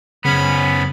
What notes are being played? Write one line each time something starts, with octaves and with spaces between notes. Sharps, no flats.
F#2 C#3 F#3 B3 C#4 B5